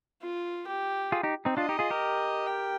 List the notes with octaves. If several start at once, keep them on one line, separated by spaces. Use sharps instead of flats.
F4
G4
F4 G#4
D#4 G4
C4 D#4
D4 F4 D#5
D#4 G4
F4 G#4
G4 A#4
G5